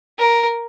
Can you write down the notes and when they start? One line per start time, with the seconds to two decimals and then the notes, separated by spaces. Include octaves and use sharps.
0.18 A#4